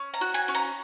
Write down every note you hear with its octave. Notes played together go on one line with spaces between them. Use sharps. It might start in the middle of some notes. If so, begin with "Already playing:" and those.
Already playing: C#4
A#5
F#4
G#5
C#4
A#5